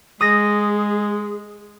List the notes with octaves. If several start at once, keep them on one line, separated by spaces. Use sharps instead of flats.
G#3 G#4 D#6 A#6